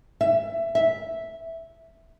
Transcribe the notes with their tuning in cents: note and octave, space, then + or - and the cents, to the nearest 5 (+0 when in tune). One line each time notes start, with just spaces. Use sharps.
E5 +15
E5 -5